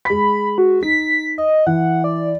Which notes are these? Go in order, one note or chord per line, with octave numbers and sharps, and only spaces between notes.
G#3 B5 B6
F#4
D#4 B6
D#5
E3 F#5
D5